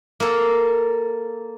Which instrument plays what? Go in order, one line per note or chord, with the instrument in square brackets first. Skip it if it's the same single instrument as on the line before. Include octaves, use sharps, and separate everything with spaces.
[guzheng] A#3 A4